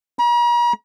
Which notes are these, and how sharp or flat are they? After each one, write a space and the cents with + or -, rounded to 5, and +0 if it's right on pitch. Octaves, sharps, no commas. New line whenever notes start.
A#5 +45